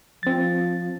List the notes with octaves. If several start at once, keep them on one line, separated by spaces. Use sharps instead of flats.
F3 C4 A6